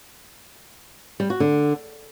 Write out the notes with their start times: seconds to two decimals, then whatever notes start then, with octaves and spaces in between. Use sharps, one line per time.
1.20 G3
1.30 F#4
1.40 D3